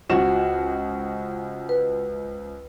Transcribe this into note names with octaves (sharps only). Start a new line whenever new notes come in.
C#2 F3 F#4 E7
B4